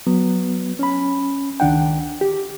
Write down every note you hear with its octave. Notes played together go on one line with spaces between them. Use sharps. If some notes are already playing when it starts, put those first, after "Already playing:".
F#3 B3
C#4 B5
C#2 D#3 D4 F#5 G5
G4